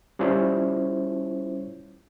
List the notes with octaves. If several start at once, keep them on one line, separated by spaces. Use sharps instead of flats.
G3 C#4 E4 F4 C5 C#5